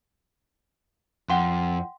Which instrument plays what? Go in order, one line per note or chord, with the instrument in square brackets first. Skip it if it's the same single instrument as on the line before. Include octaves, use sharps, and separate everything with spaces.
[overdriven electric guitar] F2 [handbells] F#5 G5 C6